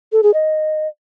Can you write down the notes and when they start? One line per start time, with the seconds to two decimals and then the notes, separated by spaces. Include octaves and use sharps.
0.12 A4
0.23 G#4
0.34 D#5